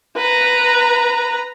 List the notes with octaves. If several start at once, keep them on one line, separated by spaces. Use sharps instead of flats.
B4 A#5